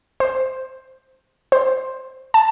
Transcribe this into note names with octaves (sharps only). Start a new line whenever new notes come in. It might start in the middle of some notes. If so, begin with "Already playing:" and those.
C5
C5
A5